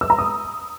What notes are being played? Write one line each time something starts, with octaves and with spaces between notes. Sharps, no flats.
E6
A#5
D#6